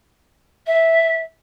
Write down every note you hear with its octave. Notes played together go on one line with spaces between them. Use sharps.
E5